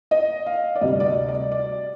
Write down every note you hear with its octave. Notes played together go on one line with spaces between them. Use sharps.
D#5
F5
D5
D2 C3 G3 D#5
D5
D#5
D5
D5